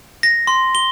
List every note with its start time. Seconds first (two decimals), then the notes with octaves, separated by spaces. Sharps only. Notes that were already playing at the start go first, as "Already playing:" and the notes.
0.23 A#6
0.47 C6
0.75 G7